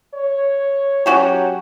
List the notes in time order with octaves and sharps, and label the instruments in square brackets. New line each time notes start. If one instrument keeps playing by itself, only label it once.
[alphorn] C#5
[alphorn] F#3 [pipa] C#4 F#4 G4